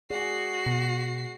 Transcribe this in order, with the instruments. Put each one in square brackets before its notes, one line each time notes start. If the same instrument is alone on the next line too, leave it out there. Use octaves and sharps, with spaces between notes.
[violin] F#4 C7 [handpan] G#4 D5
[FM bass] B2